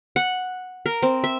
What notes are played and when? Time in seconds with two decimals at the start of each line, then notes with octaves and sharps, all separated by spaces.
0.16 F#5
0.86 A#4
1.03 C4
1.24 E5